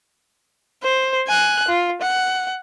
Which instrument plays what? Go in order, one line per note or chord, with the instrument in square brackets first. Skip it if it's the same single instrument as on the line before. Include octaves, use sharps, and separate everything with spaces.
[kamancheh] C5
G#5 F#6
F4
F#5